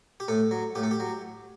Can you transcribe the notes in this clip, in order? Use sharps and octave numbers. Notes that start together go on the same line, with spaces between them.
G4
A2 A4
F#3
A2 G4
A4
G4
F#3